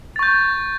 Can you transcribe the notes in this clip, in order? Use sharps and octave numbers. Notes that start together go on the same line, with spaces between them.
C#6 G6 A6